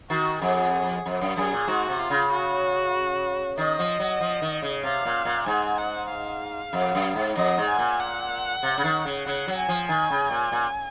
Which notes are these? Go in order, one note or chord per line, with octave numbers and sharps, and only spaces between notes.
D#3 F#4
F2 G#4
F2
F#2
F#2 G#4
A#2
G#2 F#4
C3
F4
C#3
F#4
D#3 D#5
F3
F#3
F3
D#3
C#3
C3 F5
A#2
A#2
G#2 G#5
F#5
F5
F2
F#2
G#2
F2 D#5
G#2
G#5
A#2
F#5
C3
C#3
D#3
C#3
C#3 F#5
F#3
G#5
F3
D#3 G#5
C#3
A#2
A#2